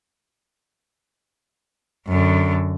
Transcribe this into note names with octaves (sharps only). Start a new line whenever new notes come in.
F#2 D3